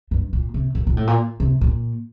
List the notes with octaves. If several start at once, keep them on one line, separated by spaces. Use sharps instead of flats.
G2
A#2
C3
A#2
A#2
A2
A#2
C3
A#2